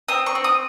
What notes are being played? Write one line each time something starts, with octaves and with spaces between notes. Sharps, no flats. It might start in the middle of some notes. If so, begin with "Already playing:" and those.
C4 D#6
C#6
C4
D#6